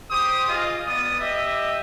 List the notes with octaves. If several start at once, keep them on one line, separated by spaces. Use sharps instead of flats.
G4 C5 D#6
F4 G#4 D#5
B3 D5 D#6
G4 D#5 E5